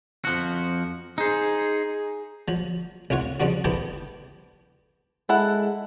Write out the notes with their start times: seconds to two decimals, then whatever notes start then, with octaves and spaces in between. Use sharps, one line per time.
0.25 F2 F3 F#4
1.18 D#4 G#4 C5
2.48 F3 F#3
3.10 C2 A2 F4 C#5 F#5
3.40 C#3 F3 G3 C4 F#4
3.64 B3 C4 E4 G4 A4 C5
5.29 G#3 E4 A4 F#5